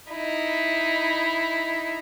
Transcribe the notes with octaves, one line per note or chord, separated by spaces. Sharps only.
D#4 E4